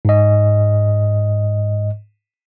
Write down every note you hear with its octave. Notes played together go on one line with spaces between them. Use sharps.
G#2 D#5